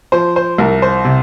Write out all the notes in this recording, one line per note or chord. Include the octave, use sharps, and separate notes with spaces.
F3 C5
C5
C2 A#4
C5
C3